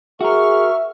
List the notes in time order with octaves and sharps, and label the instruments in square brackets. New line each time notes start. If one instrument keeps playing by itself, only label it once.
[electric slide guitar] F#4 A#4 [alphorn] G#4 [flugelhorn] E5 [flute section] C#6 F6